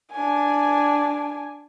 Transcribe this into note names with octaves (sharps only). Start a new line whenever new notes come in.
D4 G#5